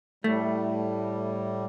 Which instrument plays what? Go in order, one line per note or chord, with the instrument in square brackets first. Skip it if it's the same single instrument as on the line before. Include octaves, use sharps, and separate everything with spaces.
[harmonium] A2 G3 [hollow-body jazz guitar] A3